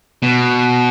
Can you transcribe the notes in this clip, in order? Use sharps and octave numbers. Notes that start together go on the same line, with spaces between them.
B2